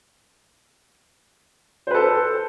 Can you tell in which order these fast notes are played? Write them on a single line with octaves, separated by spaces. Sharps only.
C5 B4 A4